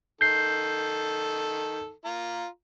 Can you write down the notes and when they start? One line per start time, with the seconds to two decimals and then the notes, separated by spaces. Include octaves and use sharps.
0.21 D#3 A4 G6 C7
2.05 F4 A#5